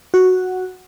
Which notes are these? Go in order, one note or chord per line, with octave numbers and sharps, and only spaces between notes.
F#4